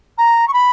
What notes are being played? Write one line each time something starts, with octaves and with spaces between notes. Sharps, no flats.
A#5
C#6
B5